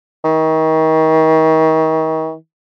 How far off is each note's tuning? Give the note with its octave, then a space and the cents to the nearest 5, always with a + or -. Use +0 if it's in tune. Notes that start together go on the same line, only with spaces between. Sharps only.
D#3 +35